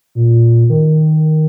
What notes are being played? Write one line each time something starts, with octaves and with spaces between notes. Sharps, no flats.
A#2
D#3